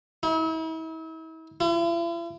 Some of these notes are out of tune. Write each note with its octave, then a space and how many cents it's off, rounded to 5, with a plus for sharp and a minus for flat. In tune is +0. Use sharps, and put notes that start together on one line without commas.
E4 -40
E4 +45